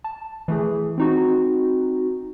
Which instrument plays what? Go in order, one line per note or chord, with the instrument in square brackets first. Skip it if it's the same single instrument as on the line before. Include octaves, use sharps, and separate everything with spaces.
[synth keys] A5
E3 A3 G#4
C4 D#4 F#4